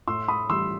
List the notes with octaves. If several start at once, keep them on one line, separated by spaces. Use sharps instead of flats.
A2 C6 E6
B5 D#6
E3 G3 C6 E6